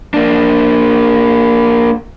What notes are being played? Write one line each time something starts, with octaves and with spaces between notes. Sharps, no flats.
A#3 D4